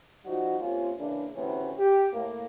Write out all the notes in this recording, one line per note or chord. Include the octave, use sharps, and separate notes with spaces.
F3 G3 D#4 F#4
C3 A#3 C#4 F4
C#3 E3 A#3 D4
D2 A2 C3 E3 B3 C#4
G4
A2 A#3